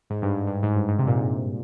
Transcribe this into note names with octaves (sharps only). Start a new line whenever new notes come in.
G#2
G2
G2
G#2
G2
G#2
C3
A#2
G#2